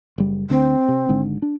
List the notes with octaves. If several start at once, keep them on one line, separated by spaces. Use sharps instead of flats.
F#1 G3
D2 D3 C4
C3
G#1 G#2 D3
D4